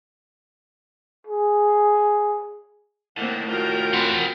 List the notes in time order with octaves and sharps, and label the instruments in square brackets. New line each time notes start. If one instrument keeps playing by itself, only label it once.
[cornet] G#4
[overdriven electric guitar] A2 D#3 [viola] A#3 C4 [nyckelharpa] F#5
[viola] F4 A#4 [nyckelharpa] F#4 G5
[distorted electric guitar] C4 F#5